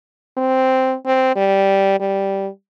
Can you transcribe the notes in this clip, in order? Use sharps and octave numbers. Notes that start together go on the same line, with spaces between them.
C4
C4
G3
G3